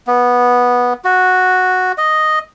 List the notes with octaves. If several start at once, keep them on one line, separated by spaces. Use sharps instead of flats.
B3
F#4
D#5